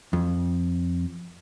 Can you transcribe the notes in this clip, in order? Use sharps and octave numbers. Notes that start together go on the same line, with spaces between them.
F2